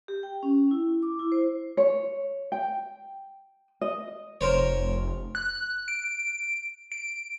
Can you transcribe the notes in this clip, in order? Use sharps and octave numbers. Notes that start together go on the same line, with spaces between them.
G4
G5
C#4
E4
D6
E4
C5
C#5
G5
D#5
F1 A#4 C5 C#5
F#6
D7
D7